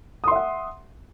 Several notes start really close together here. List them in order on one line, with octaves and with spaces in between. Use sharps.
D#6 C6 E5 F#5